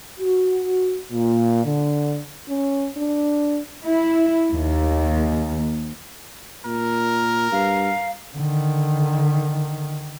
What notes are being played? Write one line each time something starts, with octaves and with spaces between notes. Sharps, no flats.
F#4
A#2
D3
C#4
D4
E4
D#2
A#2 A#4
G2 F5
D3 D#3